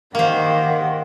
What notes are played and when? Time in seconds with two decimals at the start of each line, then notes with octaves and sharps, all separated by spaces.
0.15 D#3 A#3 G4 A#4 C5 F#5